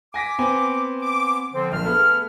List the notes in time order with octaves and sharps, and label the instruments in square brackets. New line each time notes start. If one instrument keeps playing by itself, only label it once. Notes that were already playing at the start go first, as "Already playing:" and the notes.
[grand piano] G#5 A#6 B6 [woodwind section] D6
[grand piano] B3 C4 G#5
[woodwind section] D6
D3 F3 C4
[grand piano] A#1 [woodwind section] F6
[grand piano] A3 B3 G#4